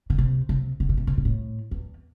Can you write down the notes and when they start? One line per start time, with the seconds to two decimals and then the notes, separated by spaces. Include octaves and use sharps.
0.10 D3
0.18 C3
0.49 C3
0.80 D3
0.89 C3
0.97 B2
1.07 C3
1.18 B2
1.25 A2
1.71 E2